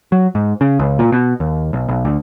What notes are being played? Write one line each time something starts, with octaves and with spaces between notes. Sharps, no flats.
F#3
G#2
C#3
C#2
A#2
B2
D#2
B1
B1
D2